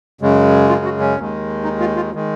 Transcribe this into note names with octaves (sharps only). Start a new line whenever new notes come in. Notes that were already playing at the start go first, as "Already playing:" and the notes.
F#2 C#3 G#3
F4
F#4
C#4
D#2 D#3 G#3
D#4
F4
F4
D#3 G#3